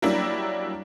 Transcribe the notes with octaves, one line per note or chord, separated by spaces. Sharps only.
F#3 G3 A#3 D4 E4